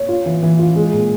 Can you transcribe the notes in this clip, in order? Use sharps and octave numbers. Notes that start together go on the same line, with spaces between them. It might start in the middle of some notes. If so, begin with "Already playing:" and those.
Already playing: C#5
F4
E3
E3
F4
G#3
A#2